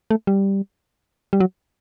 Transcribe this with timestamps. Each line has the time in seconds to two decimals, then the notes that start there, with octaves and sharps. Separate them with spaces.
0.11 A3
0.27 G3
1.33 G3
1.40 F#3